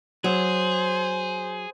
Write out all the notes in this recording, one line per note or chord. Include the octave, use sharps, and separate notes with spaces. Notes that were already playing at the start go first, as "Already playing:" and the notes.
F#3 G#4 C5